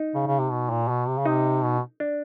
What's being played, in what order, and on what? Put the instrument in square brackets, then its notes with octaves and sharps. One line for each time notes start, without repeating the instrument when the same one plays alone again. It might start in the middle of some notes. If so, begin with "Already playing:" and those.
Already playing: [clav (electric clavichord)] D#4
[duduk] C#3
C#3
C3
B2
A#2
B2
C3
C#3
[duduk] C3 [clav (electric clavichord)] D#4
[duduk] B2
[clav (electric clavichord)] D4